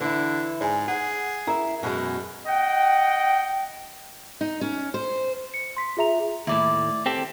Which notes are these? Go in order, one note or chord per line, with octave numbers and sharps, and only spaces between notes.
D3 E3 E4
G#2 D5 G#5
G#4 F#5
C#4 E4 A#4 E5 A#5
F#2 B2 G#3
D#5 F#5 G5
D#4
C#4
C5
C#7
C6 B6
F4 G#4 E5 A#5 F7
D#2 A2 E4 D5
C4 G4 A4